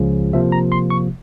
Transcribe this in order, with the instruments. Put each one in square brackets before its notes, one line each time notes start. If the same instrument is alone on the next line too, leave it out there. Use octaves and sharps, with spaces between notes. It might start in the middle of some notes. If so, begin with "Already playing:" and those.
Already playing: [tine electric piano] C#2 C#3 F3
C3 F3 A#3 E5
A#5
C6
C#6